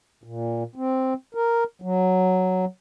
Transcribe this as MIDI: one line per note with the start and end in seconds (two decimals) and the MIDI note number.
0.24 0.63 46
0.76 1.14 60
1.35 1.64 70
1.82 2.65 54